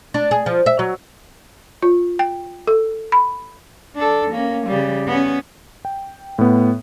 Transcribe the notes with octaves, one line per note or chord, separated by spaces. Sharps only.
D4
G#4
F3
E5
F#3
F4
G5
A4
B5
D4 A4
A#3 C#4
C#3 G3
B3 C#4
G5
A2 B3